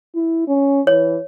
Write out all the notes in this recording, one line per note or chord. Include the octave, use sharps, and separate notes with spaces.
E4
C#4
E3 C#5